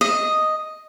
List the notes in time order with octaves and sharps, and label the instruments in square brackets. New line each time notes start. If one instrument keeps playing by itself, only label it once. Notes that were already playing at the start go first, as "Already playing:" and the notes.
[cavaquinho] D#5